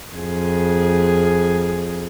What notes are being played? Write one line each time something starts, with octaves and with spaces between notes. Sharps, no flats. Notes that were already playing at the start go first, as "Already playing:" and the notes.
F2 G#4